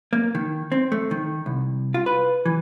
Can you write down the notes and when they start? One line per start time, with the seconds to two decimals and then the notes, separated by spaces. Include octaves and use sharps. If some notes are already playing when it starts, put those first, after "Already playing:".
0.13 A#3
0.35 D#3
0.72 C4
0.92 A3
1.11 D#3
1.46 C2
1.94 F4
2.06 B4
2.46 E3